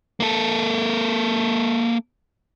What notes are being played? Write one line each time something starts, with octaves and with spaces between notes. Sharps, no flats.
A#3 A4